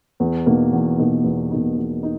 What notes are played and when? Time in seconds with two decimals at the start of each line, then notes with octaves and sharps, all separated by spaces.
0.20 E2
0.46 B2 A#3 D#4
0.73 E2
0.98 B2 A#3 D#4
1.24 E2
1.51 B2 A#3 D#4
1.77 E2
2.03 D#4